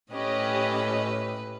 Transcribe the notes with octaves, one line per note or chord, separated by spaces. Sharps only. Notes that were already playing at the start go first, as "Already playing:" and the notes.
A2 C#4 G4 B4 D#5